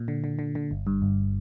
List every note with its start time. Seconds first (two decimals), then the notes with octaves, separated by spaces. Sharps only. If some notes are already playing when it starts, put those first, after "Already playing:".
Already playing: A#2
0.08 D3
0.24 D3
0.39 D3
0.55 D3
0.71 G1
0.87 G2
1.02 G1